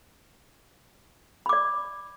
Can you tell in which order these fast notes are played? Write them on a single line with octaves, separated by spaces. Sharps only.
B5 D6 D5